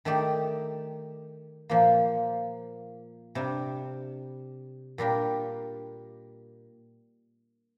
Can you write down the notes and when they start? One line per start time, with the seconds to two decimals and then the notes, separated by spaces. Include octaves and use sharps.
0.05 D#3 A3 D#4 G4 D5
1.70 A#2 F3 A#3
3.35 C3 G3 D4
4.98 A#2 G3 D4 G4 A#4